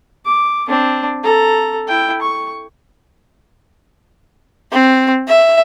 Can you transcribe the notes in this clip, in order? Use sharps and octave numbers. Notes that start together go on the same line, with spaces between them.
D6
C4 D4
A4 A#5
E4 G5
C#6
C4
E5